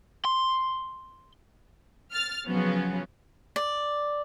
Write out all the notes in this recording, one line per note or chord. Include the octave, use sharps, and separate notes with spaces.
C6
F6 A6
C#3 F3 F#3 B3 C#4
D5